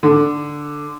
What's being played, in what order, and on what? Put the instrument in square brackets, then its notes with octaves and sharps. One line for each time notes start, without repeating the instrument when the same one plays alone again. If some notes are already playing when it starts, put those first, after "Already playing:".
[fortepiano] D3